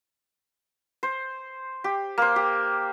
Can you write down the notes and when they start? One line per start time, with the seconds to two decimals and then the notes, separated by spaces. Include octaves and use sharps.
1.03 C5
1.84 G4
2.18 A#3 C5
2.36 G4